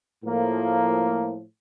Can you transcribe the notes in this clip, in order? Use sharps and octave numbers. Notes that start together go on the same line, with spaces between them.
A2 F3 A#3